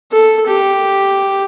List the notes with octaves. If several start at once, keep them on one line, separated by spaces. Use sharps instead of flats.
A4
G4